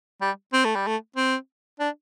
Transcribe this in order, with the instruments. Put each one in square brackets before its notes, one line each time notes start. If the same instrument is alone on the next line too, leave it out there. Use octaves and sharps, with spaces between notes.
[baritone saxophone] G3
C4
A3
G3
A3
C4
D4